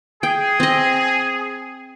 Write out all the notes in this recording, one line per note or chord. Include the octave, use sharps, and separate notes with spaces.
G#4 G5
C4 D#5